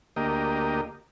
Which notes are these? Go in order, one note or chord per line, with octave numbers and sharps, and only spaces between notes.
D2 A#3 G4 D#5